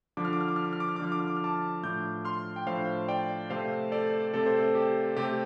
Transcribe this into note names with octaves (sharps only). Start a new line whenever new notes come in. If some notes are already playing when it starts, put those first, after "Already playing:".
D3 F3 D4 D6
F6
D6
F6
D6
F6
D6
F6
D6
F6
D6
D3 F3 D4 F6
D6
F6
D6
F6
A5 D6
A2 F3 D4 D6 G6
C6 F6
G5
A2 F3 D4 C5 F5
D5 G5
C3 A3 C4 C5 F5
A4 D5
C3 A3 C4 A4
C5
A4
G4
C3 A3 C4 G4